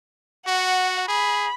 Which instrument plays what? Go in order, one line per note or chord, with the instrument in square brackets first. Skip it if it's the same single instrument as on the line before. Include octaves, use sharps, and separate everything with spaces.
[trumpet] F#4 [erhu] F#5
[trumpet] G#4 [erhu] B5